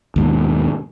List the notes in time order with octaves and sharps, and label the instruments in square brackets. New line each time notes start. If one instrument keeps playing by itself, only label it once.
[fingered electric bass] D#2 G#2 B2